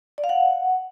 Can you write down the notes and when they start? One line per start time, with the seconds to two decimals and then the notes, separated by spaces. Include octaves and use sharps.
0.18 D5
0.24 F5
0.29 F#5